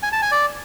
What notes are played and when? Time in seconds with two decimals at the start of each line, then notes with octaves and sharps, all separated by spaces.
0.03 G#5
0.12 A5
0.22 G#5
0.32 D5